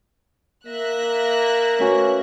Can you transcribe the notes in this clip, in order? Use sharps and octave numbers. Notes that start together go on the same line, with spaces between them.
A#3 E5 F#6 A#6
A3 C#4 F#4 B4